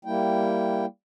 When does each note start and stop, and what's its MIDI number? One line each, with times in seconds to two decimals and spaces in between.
0.05 0.86 55
0.05 0.86 58
0.05 0.86 64
0.05 0.86 79